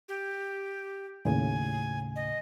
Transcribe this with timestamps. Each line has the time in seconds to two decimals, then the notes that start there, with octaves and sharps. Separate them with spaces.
0.08 G4
1.25 D#2 A2 C#3 G#5
2.16 D#5